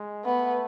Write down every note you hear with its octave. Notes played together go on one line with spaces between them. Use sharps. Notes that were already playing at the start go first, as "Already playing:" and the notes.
Already playing: G#3
A3 B3